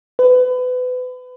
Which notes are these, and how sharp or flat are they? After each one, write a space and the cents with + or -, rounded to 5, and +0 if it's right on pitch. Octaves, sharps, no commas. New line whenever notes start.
B4 +30